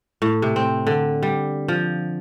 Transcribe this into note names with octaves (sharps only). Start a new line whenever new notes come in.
A2
C3
C4
D3
G3
F3